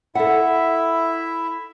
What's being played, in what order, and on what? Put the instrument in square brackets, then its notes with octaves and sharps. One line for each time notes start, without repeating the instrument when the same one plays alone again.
[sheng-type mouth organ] E4 E5 [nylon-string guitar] A4 F#5